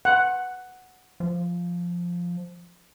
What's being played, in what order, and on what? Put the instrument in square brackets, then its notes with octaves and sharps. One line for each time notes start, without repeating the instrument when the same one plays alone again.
[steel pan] F#5
[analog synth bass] F3